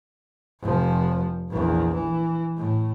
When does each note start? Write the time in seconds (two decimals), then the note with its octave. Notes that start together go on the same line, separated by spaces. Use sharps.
0.62 F1 F3
1.50 A#1 E2
1.94 E3
2.57 A2